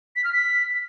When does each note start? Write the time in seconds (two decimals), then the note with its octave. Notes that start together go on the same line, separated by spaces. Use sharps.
0.16 B6
0.24 F6
0.33 B6